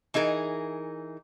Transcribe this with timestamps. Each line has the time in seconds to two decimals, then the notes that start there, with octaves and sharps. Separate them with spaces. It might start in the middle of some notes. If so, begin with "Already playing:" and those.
0.14 E3 D#4 G#4 A#4